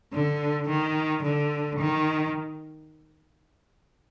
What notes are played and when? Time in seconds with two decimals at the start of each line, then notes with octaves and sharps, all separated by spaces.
0.13 D3
0.69 D#3
1.23 D3
1.79 D#3